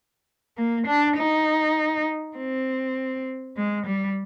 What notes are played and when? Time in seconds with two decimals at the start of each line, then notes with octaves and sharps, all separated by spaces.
0.57 A#3
0.87 D4
1.17 D#4
2.37 C4
3.57 G#3
3.86 G3